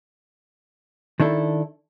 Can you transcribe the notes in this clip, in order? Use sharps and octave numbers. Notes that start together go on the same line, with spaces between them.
D#3 D4 E4 A4